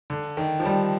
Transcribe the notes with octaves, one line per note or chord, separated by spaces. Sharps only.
D3
D#3
F3
G3